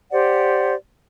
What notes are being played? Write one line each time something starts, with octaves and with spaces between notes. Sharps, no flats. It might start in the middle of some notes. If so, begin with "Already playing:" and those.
G4 C5 D5 F#5